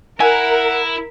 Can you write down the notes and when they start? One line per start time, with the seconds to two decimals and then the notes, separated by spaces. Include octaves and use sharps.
0.20 E4 A#4 F#5 G#5